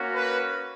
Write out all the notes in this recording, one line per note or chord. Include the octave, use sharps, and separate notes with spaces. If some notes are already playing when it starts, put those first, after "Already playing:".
Already playing: A#3 C#4 F#4
B4